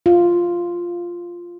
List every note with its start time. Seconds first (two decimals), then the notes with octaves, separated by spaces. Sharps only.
0.06 F4